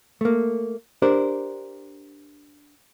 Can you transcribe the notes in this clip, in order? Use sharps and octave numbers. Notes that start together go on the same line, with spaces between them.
A3 A#3
D4 G4 A#4 C5 D5